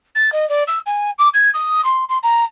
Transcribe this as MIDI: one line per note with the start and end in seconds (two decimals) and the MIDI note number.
0.15 0.30 93
0.32 0.48 75
0.49 0.63 74
0.67 0.79 88
0.86 1.11 80
1.18 1.29 86
1.34 1.50 92
1.54 1.84 87
1.84 2.04 84
2.09 2.18 84
2.23 2.44 82